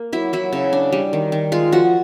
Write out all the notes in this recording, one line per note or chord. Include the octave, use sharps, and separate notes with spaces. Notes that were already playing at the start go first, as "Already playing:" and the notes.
Already playing: A#3
F#3 E4
F#3 E4
C#3
D4
G3
D#3
D#3
G#3 F4
F3 F#4